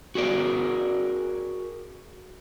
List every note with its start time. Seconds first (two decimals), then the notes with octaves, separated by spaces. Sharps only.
0.15 F#4 G#4 A#4 D5